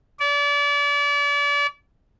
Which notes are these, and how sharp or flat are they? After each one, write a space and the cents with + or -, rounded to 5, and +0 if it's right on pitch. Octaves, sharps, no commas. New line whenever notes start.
D5 -35